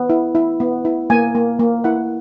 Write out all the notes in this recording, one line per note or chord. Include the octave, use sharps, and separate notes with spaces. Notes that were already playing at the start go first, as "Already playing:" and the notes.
Already playing: B3
E4
E4
B3
E4
A#3 G#5
A#3
A#3
E4 F#5